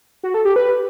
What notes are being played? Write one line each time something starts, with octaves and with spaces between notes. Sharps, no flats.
F#4
A4
G4
B4